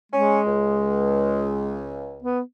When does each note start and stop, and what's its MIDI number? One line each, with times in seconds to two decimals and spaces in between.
0.12 1.85 56
0.12 0.40 61
0.45 2.31 37
2.22 2.40 59